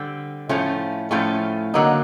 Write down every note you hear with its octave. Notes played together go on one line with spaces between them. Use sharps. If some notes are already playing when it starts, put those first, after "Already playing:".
Already playing: D3 G3 C4
A2 F3 A3 C#4 F4
A2 F3 A3 C#4 F4
D3 F#3 A#3 D#4